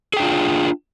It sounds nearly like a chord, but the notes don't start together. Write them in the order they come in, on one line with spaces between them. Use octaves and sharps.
G#4 G5 D4 F4